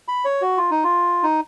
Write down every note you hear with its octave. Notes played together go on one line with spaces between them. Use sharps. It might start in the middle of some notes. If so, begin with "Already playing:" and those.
B5
C#5
F#4
F4
D#4
F4
D#4